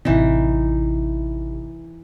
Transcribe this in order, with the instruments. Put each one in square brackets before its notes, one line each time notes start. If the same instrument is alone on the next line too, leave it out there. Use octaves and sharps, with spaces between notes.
[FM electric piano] A1 C3 [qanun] E3 D#4